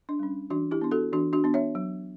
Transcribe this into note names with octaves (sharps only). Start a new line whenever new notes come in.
D4
G3 C#4
E3 D4 F#4
E4 G4
B3 D4
F#4 A4
E3 D4 F#4
D4 F#4
B3 D4
C#5 E5
F#3